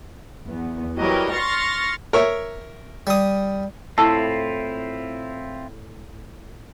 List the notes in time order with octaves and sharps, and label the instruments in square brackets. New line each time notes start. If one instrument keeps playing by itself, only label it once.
[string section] E2 B3
E3 F#3 G3 G4 A#4 D#5
C6 C#6 F6 A6 A#6 C#7
[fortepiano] A#4 C#5 E5
[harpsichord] G3 D#6
[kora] A2 [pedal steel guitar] C4 E4 F4 [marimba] A5 E6